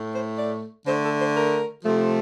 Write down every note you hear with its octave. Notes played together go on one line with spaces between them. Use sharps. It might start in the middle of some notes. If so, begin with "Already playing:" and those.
Already playing: A2 A3
C5
D5
D3 A3 C5
A4
C5
A#4
C3 F3 A3